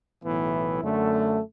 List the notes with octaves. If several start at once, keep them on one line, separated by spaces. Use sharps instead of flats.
B1 A2 E3 B3 E4
F#2 D3 A3